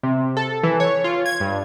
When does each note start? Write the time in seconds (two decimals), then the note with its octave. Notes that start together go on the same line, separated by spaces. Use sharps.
0.03 C3
0.37 A4
0.63 E3
0.80 C#5
1.04 F4
1.26 G#6
1.40 G2